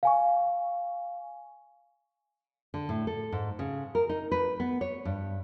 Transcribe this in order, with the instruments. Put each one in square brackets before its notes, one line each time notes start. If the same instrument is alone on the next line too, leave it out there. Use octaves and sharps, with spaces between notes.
[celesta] F5 G#5 C#6
[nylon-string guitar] D3
A2
A4
G#2
C#3
A#4
D#4
B4
B3
C#5
G2